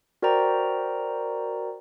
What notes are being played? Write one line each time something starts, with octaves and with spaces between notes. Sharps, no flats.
F#4 A#4 C5 D5 G5 A#5